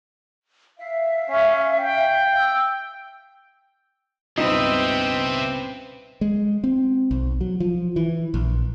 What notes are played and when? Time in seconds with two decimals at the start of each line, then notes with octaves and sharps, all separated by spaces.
0.78 E5 F5
1.29 C#4
1.79 G5
2.36 E6
4.38 C#2 G2 B2 C4 D#4 B4 C5 E5
6.21 G#3
6.64 C4
7.11 B1
7.41 F#3
7.60 F3
7.96 E3
8.34 A#1